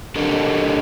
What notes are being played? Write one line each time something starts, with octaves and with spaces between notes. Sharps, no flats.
D4 G4 A4 A#4 D#5